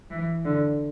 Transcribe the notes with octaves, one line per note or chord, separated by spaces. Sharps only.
E3
D3